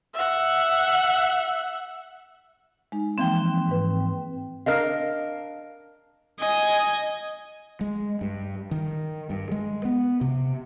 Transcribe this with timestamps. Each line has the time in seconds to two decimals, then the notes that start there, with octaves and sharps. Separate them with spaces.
0.14 E5 F#5
2.92 G#3 D#4
3.18 E3 F3 A#3 C4 G5
3.67 G#2 E3 B4
4.66 D4 A#4 D#5 F5
6.40 D#5 G#5
7.81 G#3
8.21 G2
8.71 D#3
9.30 G2
9.52 G#3
9.85 B3
10.21 C3